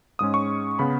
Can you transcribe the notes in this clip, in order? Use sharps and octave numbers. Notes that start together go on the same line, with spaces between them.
G#2 G#3 C#4 D#6
C#6
C#3 B3 B5